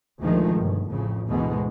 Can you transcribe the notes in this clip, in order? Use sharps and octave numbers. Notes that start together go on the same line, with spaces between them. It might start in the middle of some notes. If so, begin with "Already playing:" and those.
D2 A#2 D#3 F3 G#3 A3
G1 B2
A1 F2 C#3
D2 G#2 B2 E3 G#3 B3